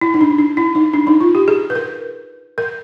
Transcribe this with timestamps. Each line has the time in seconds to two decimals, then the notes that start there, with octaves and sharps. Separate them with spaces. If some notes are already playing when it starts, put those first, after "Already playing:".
0.01 E4
0.14 D#4
0.21 D4
0.38 D4
0.57 E4
0.75 D#4
0.93 D4
1.07 D#4
1.21 F4
1.35 G4
1.48 G#4
1.70 B4
1.75 A#4
2.58 A#4